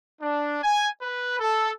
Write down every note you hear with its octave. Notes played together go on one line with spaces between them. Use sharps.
D4
G#5
B4
A4